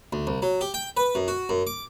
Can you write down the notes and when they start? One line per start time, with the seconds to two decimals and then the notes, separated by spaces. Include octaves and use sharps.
0.13 D2
0.27 C2
0.42 F#3
0.61 G4
0.74 G5
0.97 B4
1.15 F#2
1.28 F#4
1.49 F#2
1.67 D6